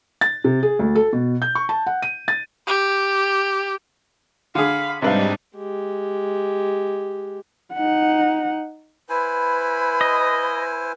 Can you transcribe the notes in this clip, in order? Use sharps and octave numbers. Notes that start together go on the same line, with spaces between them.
A6
C3
G#4
D2
A4
B2
G6
C#6
A5
F#5
D#7
A6
G4
D3 G#4 F5 B5
G#2 C3 G3 D4 D#4 B4 F5
G#3 G4
D#4 F#5
E4 B4 C5 G#5 B5
D#5